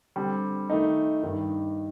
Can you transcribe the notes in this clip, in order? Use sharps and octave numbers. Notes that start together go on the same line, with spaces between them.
D3 G3 C4
D#3 A3 D#4
G2 D#3 G3